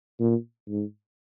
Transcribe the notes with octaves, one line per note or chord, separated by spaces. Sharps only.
A#2
G#2